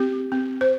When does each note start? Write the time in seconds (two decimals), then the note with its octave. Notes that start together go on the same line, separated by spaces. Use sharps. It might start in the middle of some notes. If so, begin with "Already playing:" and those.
Already playing: C4 G4
0.32 C4
0.61 C5